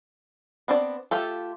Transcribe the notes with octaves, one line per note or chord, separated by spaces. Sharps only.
B3 C4 D4 D5
A3 F4 G4 A4